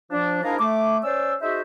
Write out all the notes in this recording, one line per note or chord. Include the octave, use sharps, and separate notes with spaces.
F3 D4
G#2 D4 E4 G#4 A#4 F5
A3 D6
C#4 C5 D5 E6
D#4 F#4 G#4 C5 E5